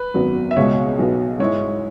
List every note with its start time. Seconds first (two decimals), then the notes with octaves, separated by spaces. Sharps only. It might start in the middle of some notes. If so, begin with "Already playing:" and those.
Already playing: B4
0.14 G#1 F#2 F#3 B3 F#4
0.51 E5
0.56 C#2 B2 G#3 C#5
0.98 B1 B2 B3 F#4
1.39 G#2 G#3 E4 C#5